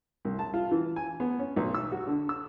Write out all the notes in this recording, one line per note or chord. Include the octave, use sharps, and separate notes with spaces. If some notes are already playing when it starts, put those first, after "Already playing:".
C2
A5
F4
E3
G#5
B3
C#4
B1
E6
F#4
D3
E6